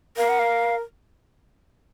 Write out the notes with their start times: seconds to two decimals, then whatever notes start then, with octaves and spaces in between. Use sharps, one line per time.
0.17 A#4 F5
0.29 F#5
0.39 F5